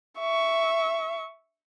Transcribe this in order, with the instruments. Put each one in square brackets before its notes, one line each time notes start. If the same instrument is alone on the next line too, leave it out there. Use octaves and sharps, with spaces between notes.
[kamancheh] E5 C#6